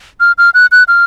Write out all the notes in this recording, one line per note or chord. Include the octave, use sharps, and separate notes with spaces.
F6
F6
F#6
F#6
F6